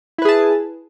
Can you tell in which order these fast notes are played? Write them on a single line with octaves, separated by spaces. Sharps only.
E4 B4 G#4 A5